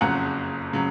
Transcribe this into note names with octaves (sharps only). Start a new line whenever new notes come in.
F#1 F2 C#3 F#3 F#5 A#5
C#3 F#3